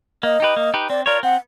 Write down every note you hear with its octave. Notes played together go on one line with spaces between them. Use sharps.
A#3 D#5
D#4 G4 B4
A#3
D#4 G4 B4
C4 D5
F4 A#4 C#5 D5
C4 F#5